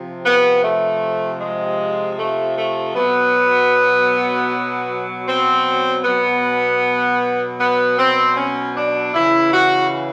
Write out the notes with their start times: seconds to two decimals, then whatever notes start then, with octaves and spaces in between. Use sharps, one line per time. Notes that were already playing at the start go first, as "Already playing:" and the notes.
Already playing: C3 F3
0.25 B3
0.62 A3
1.39 G#3
2.17 A3
2.56 A3
2.94 B2 F#3 B3
5.27 C4
6.04 B2 F#3 B3
7.59 B3
7.98 C4
8.36 C#4
8.76 D4
9.14 C#3 E3 E4
9.52 F#4